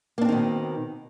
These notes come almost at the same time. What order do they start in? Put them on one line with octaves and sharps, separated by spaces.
A#3 D4 C4 D#3 B2